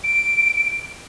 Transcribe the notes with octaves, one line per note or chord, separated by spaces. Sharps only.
D7